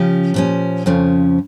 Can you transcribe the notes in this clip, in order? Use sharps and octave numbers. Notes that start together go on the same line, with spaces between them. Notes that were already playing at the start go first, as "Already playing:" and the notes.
Already playing: C#3 F3 C#4 G4
A#2 F3 C#4
F2 C#3 F3 C#4